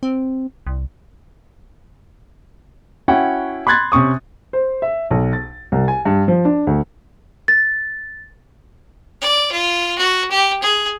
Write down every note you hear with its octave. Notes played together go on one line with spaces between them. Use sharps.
C4
C2
C#4 E4 F#4 F#5 G5
B5 C6 F#6 G#6 A6
C3 C#4 C#6 D#6
C5
E5
B1
A6
C2
G#5
G2
F3
D4
D2
A6
D5
F4
F#4
G4
G#4